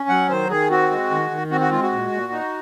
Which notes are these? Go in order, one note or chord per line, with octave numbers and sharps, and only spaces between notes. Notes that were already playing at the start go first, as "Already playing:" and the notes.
Already playing: C#4
F#3 F#5
D#3 C5
D#3 G#4
C4 F#4
G#3
D#3
D#3
C4 F#4
F#4
G#3 F4
F#4
A#2
A#2
D#4